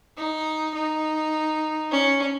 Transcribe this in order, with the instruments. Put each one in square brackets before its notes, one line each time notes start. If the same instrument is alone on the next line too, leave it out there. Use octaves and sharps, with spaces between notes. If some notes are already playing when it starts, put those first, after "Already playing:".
[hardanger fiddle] D#4
D#4
C#4